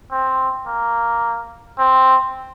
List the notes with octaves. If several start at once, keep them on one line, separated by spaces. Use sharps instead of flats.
C4
A#3
C4